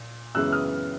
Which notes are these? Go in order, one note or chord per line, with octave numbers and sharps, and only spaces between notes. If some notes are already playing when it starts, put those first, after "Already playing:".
Already playing: A#2
F#2 C#3 E3 G#3 B3 E6 F#6
D#6 F6